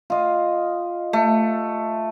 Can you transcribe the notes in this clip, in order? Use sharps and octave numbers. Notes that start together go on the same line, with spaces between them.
F4 D#5
A3